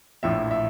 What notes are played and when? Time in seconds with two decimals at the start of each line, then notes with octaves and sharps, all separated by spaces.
0.23 A#1 A2 F3 E5
0.51 E5